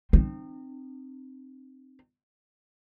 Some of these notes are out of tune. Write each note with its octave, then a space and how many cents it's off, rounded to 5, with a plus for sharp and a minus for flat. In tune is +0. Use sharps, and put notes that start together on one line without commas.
C4 +0 D#4 -35